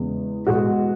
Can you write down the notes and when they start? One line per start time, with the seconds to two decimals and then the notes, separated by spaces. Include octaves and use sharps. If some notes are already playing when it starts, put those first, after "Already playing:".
Already playing: E2 C#3 G#3 B3
0.47 B2 G#3 B3 F#4